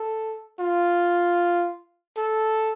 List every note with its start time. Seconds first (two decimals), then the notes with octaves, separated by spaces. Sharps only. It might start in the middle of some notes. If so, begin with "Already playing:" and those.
Already playing: A4
0.60 F4
2.17 A4